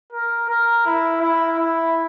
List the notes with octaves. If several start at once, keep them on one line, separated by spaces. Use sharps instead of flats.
A#4
A#4
E4
E4
E4